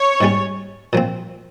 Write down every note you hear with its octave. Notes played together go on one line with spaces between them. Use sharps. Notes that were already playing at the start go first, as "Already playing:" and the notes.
Already playing: C#5
G#2 G3 C#4
A#2 F3 C4